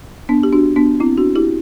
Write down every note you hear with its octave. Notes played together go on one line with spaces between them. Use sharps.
B3 D4
G4
D4 F#4
B3 D4
C4 E4
D4 F#4
E4 G4